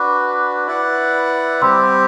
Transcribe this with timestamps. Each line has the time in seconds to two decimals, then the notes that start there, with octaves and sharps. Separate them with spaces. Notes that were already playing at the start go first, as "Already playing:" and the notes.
Already playing: D4 F#4 B4 D6 F#6
0.67 E4 B4 D5 F#5
1.61 G3 C4 G4 C6 E6